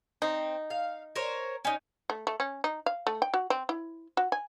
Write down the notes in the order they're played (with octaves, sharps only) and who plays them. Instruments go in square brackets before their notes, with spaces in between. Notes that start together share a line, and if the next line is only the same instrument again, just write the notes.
[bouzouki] C4 [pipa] D#4
[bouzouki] F5
A#4 C5 C#5
C#4 D#4
[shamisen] A3
A3
C#4
D#4
F5
A3
G5
F#4
C4
E4
F#4
G#5